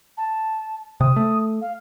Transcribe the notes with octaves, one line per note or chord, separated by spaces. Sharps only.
A5
C3 D#6
A3
F5